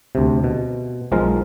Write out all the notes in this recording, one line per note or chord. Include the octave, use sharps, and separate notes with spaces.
D2 C3
B2
B1 F3 G#3 A#4 F5